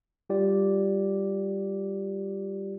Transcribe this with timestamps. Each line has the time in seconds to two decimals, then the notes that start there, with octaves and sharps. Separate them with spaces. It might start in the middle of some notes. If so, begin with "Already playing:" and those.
0.30 G3 F4 G4 D5